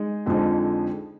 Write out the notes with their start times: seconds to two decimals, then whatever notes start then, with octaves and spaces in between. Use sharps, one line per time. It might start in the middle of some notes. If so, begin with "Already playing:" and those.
Already playing: G#3 D#4
0.26 F2 D3 F3 G#3 D#4